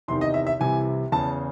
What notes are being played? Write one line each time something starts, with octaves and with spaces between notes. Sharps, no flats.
E2 C3 D#3 C6
D#5
E5
E5
C2 C3 E3 G#5
E2 C#3 E3 A5